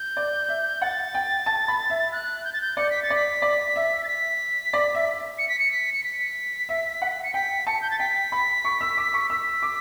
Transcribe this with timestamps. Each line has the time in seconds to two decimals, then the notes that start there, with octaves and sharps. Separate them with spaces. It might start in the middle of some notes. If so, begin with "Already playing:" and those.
Already playing: G6
0.17 D5
0.49 E5
0.82 F#5 A6
1.14 G5
1.46 A5
1.68 B5
1.90 E5
2.12 F#6
2.44 G6
2.53 A6
2.62 G6
2.77 D5 C#7
2.90 B6
3.03 A6
3.10 D5 B6
3.42 D5
3.76 E5
4.04 A6
4.08 B6
4.73 D5
4.95 E5
5.39 C#7
5.49 B6
5.59 C#7
5.71 B6
5.93 C#7
6.04 B6
6.69 E5
7.02 F#5
7.24 C#7
7.34 G5 B6
7.67 A5 C#7
7.82 G6
7.91 A6
7.99 G5 B6
8.32 B5
8.65 C#6
8.81 E6
8.97 D6
9.14 C#6
9.30 E6 B6
9.63 D6